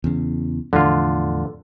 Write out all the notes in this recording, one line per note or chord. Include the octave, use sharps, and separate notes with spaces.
E2 C#3
E2 A2 D3 F3 F4